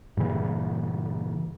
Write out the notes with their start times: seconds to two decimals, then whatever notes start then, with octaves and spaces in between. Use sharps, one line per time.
0.17 G2 A#2 C#3 E3